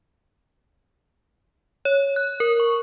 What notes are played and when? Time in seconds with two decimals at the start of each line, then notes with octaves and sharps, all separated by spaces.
1.85 C#5
2.16 F#6
2.40 A#4
2.60 C#6